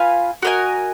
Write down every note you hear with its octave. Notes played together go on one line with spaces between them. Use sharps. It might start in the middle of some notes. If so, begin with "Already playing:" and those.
Already playing: F4 B4 F5 G#5
F#4 A#4 D#5 G#5